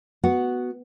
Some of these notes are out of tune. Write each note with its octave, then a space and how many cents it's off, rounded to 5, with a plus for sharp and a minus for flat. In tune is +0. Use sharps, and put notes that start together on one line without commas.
B3 +0 F#4 +0 F#5 +0